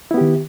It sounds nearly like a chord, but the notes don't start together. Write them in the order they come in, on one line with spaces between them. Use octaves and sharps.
E4 B3 G4 D#3